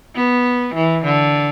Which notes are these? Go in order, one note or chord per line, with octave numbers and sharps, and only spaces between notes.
B3
E3
D3